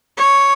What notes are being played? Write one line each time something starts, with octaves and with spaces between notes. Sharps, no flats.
C#5